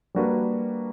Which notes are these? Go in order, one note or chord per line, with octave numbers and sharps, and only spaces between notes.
G3 A#3 D4 F#4 B4